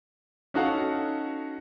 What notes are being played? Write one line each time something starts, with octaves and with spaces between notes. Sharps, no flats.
C#4 D#4 F#4 A4 F5 F#5